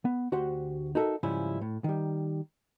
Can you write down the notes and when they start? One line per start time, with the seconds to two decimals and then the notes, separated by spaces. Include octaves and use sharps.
0.05 B3
0.32 D2 F#4 G4 C5 F#5
0.95 D#4 F#4 A4 A#4 E5
1.23 G#2 C#3 F3 G3 C#4 E4
1.61 A2
1.84 D#3 G3